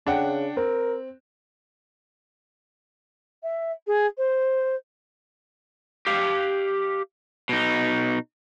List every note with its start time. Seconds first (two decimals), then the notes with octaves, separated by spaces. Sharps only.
0.07 C#3 D4 F#5 G5
0.57 C4 A#4
3.43 E5
3.87 G#4
4.18 C5
6.07 G4 F5
7.49 B2 D#4